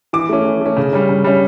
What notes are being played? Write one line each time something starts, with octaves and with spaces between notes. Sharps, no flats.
E3 D6
A3 C#4
E3
A3 C#4
C#3
G3 C#4
C#3
G3 C#4